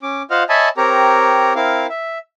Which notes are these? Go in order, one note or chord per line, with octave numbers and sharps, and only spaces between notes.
C#4 D6
F4 C5 D#5 F5 F#5 F6
C#5 D#5 E5 G#5 A5 B5
C4 G4 A#4 C#5 A#5
C4 E4 A#4 F5
E5